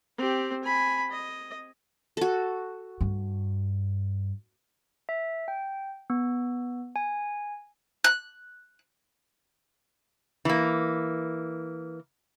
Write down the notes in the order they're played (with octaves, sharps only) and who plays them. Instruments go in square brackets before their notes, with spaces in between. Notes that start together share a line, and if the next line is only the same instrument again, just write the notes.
[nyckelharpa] C4 G4
G#5 B5
D#5
[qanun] F#4 A4
[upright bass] G2
[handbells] E5
G5
B3
G#5
[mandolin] F#6
[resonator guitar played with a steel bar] E3 A#3